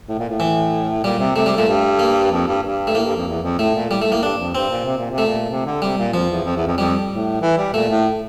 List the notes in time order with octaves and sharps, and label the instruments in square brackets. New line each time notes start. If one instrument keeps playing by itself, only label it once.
[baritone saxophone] A2
A#2
A2
[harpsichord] E3
[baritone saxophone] A#2 [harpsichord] G3
[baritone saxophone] C3
[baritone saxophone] C3 [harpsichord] A3
[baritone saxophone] C3 [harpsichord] G3
[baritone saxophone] A#2 [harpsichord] A3
[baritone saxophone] G2
[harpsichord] A#3
[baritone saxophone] F2
G2
G2
[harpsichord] A3
[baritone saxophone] A2 [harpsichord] A#3
[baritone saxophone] G2
F2
E2
F2
[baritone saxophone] A2 [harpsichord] A3
[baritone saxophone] A#2
[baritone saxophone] A2 [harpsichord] G3
[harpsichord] A3
[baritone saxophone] A2 [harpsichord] A#3
[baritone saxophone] G2 [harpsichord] D4
[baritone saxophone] F2
[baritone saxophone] G2 [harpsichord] C4
[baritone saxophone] A#2
C3
A#2
C3
[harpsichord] A3
[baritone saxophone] A#2
C3
D3
[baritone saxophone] C3 [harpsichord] G3
[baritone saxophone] A#2
[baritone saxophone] F2 [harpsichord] F3
[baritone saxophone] E2
F2
E2
F2
[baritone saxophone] F2 [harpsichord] G3
[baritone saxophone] A2
E3
G3
[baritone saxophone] A#2 [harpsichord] A3
[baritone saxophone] A2